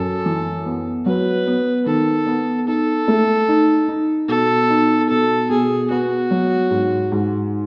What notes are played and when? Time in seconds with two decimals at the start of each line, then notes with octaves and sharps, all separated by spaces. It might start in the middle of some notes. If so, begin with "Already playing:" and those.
Already playing: F#2 A4
0.26 E3
0.66 B3
1.06 F#3 B4
1.47 B3
1.86 D#3 A4
2.27 B3
2.67 D#4 A4
3.08 A3
3.48 D#4
3.88 D#4
4.28 B2 A4
4.70 D#4
5.09 B2 A4
5.49 B2 G#4
5.91 B3 F#4
6.31 F#3
6.71 G#2
7.12 G#2